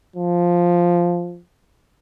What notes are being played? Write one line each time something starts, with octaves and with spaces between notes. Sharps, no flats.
F3